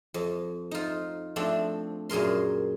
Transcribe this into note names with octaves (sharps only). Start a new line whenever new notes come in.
F2
D#4 F4
F3 A3 C4 D4
F#2 A#2 G#4 A#4 C6